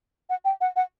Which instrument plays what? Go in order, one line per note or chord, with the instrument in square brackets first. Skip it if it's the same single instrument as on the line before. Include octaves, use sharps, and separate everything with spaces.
[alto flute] F#5
G5
F#5
F#5